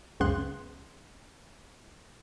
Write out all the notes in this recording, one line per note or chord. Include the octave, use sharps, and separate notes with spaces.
C#2 F#2 C#3 B3 C6 F#6